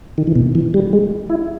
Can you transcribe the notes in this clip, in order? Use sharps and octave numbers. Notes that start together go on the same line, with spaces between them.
D#3
E3
B2
E3
G3
G#3
E4